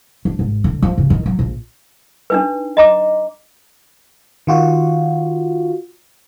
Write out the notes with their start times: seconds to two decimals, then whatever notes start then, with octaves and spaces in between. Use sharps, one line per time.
0.25 D4
0.39 G#1
0.64 D3
0.82 F3
0.98 C#3
1.10 D#3
1.26 F#3
1.39 A#1
2.30 D4 D#4 B4
2.77 D#5 A#5 D6
4.47 D#3 F4 F#4